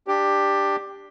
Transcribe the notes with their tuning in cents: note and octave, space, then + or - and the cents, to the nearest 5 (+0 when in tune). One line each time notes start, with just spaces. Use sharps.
D4 +10 G4 +10